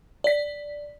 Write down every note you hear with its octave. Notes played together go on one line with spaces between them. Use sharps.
D5 B6